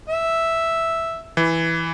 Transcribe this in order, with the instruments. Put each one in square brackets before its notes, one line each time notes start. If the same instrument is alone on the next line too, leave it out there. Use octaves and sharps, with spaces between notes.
[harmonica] E5
[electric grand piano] E3